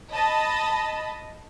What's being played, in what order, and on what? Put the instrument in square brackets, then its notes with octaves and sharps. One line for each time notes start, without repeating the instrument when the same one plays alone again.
[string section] D#5 A5 B5